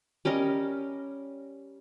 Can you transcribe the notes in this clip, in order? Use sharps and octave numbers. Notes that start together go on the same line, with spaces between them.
G3 C#4 A#4 D#5